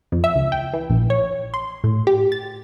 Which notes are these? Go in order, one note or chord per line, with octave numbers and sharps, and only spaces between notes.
F2
E5
C#2
G5
E3
A#1
C#5
C6
A2
G4
A6